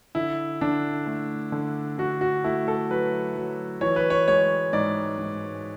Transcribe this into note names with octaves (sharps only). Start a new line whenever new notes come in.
D3 E4
D3 D4
A3
D3
D3 F#4
F#4
A3 E4
A4
F#3 B4
F#3
E3 C#5
B4
C#5
G#3 C#5
G#2 D5
G#2